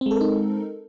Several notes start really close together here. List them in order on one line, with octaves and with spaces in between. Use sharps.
C4 G#3 A4 A#4 D#4